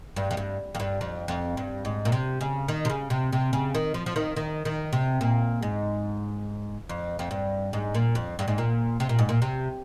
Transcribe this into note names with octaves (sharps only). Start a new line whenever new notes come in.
G2
F2
G2
F2
G2
F2
F2
G2
G#2
A#2
C3
C#3
D#3
C3
C#3
C3
C3
C#3
D#3
F3
F3
D#3
D#3
D#3
C3
A#2
G#2
F2
F2
G2
G#2
A#2
F2
G2
G#2
A#2
C3
A#2
G#2
A#2
C3